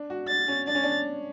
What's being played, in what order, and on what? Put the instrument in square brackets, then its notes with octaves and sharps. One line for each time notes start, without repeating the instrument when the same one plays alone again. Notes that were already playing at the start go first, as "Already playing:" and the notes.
Already playing: [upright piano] D4
F#4
[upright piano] D4 [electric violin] A6
[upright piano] C#4
[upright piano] D4 [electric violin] A6
[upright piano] C#4
D4